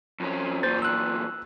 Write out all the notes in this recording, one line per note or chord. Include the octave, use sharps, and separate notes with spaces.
F2 C#4
E2 A#2 C5 G6 A6
E6 F#6